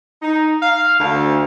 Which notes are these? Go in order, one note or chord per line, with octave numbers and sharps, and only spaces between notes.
D#4
F5
D2